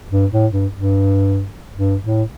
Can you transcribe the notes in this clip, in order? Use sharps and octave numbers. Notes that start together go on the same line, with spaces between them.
G2
A2
G2
G2
G2
A2